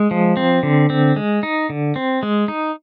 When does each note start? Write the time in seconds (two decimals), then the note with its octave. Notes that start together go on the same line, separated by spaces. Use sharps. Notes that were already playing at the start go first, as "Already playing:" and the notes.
Already playing: G#3
0.11 F3
0.37 C4
0.63 D3
0.90 C4
1.16 G#3
1.43 D#4
1.70 D3
1.96 C4
2.23 G#3
2.48 D#4